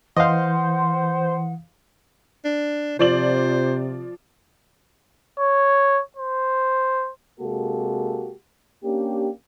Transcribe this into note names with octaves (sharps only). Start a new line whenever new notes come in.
E3 C5 D#5 F5 F#5
D4
C3 F3 C5 D5 F#7
C#5
C5
C3 G#3 A#3 F#4 G4 A4
A#3 C#4 D4 G4